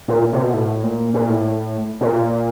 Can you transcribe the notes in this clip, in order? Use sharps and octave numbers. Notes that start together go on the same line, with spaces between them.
A#2
C3
B2
A2
A#2
A#2
A2
B2
A#2